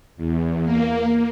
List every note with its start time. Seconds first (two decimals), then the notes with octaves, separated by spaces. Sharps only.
0.17 E2
0.64 A#3